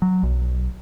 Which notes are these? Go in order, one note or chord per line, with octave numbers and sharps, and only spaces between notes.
F#3
B1